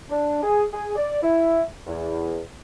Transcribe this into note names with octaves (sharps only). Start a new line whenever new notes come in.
D4
G#4
G#4
D5
E4
E2